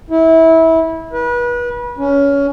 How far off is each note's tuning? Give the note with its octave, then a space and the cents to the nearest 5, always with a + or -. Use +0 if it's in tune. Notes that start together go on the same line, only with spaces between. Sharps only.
E4 -25
B4 -30
C#4 +20